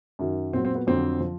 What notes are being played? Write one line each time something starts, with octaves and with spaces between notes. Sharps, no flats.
F#2 D#3 F#3
A#2 F#3 C4
C4
B3
F2 D3 F#3 C4
F3